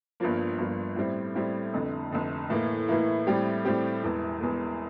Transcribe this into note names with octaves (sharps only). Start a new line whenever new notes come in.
G1 G2 F3 A#3
G1 G2 F3 A#3
A2 G3 C4 E4
A2 G3 C4 E4
F1 F2 D3
F1 F2 D3
A2 E3 A#3 E4
A2 E3 A#3 E4
A2 G3 C4 G4
A2 G3 C4 G4
E1 E2 E3
E1 E2 E3